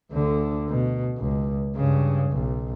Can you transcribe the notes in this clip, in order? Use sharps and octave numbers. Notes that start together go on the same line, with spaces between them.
D2 D3
B2
C#2
G2 C#3
B1